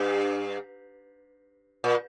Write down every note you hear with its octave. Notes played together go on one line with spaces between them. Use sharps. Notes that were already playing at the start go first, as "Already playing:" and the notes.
Already playing: G2
A#2